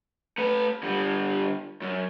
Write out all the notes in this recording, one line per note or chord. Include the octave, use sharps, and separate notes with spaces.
A3 B4
D3 G3
F#2